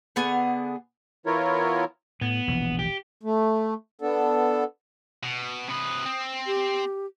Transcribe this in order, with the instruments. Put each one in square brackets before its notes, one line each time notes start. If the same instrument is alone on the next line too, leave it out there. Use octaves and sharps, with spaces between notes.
[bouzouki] D3 B3 G#4 F#5
[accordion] E3 B3 E4 F4 A#4 C#5
[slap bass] A2 [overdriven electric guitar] B3
[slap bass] E1 A#1 E3
[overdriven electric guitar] G4
[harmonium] A3
B3 D4 A4
[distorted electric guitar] B2
[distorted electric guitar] C3 B4 [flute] D#6
[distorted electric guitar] C4
[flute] G4